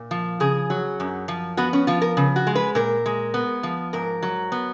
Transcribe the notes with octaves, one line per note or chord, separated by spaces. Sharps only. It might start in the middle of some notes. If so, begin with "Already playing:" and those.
Already playing: A#2
F3
C#3 G#4
F#3
F#2
F3
B3 F#4
C#4
F3 F4
A#4
C#3
F#4
G#3
B4
A#2 A#4
G#3
B3
F3
G#2 A#4
F#3
B3